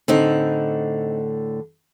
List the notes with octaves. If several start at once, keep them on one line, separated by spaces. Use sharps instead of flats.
A2 D3 C4 D#4 F#5